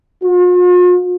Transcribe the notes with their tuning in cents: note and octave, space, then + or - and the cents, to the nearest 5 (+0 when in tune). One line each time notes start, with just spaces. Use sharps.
F4 +45